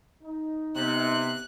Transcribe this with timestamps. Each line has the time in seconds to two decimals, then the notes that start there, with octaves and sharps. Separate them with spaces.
0.24 D#4
0.75 C3 B3 F#6